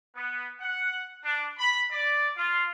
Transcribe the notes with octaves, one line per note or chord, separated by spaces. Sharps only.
B3
F#5
D4
B5
D5
F4